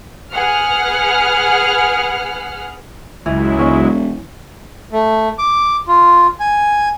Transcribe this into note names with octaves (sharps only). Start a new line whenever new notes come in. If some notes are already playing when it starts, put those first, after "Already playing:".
G#4 B4 F#5 F6
C#2 E3 F#3 G#3 E4
E1 C#4
A3
D6
F4
G#5